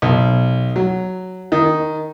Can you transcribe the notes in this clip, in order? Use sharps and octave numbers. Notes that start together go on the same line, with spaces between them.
B1
F#3
D#3